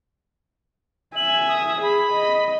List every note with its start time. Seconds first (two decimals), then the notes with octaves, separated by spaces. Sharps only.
1.15 E5 G#5 F#7
1.48 D#6
1.82 G#4 B5
2.13 D#5